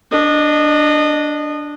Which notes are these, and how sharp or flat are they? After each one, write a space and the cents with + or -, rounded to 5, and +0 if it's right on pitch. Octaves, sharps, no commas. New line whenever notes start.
D4 +0 D#5 -25